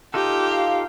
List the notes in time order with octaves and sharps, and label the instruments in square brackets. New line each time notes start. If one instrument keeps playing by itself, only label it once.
[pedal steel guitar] D#4 F4 A4 [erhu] G4
[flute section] F5